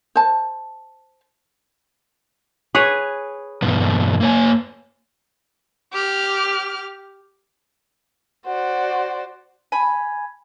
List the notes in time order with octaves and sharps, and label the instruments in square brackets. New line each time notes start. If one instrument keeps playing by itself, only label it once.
[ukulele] C5 A5
[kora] G#4 B4 C#5
[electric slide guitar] E2 G2 B2
A#3 C#5 G#5
[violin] G4 F6
[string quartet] F#4 C5 D5 [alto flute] F#5
[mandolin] G#5 B5